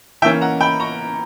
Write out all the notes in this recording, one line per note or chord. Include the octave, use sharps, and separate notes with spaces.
E3 A#3 C#4 E5 G5
F#5 A#5
G5 B5
A#5 C#6